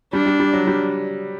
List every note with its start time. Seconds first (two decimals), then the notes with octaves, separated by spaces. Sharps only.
0.13 G3 D4
0.26 G3
0.40 G3
0.53 F#3
0.67 G3